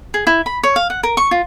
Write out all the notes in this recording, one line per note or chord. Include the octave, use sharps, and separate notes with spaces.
G#4
E4
B5
C#5
F5
F#5
A#4
C#6
F4